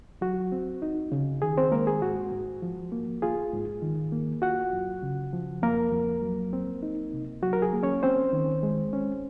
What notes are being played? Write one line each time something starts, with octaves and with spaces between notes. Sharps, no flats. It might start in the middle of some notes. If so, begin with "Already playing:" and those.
F#3 F#4
C4
D#4
C#3
D#3 G#4
C4 C5
G#3 A#3 A#4
G#4
G#2 F#4
G#2
F3
A#3
F4 G#4
G#2
D#3
A#3
F4 F#4 F#5
F#2
C#3
F3
F2 A#3 A#4
F2
F#3
C4
D#4
C3
F#3 F#4
A#4
G#4
A#3
C#4 C#5
C4 C#4 C5
D#3
G#3
C#4